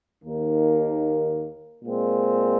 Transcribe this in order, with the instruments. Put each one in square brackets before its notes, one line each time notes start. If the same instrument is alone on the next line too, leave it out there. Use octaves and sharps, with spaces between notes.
[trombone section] D#2 D#3 A#3
A#2 G#3 C4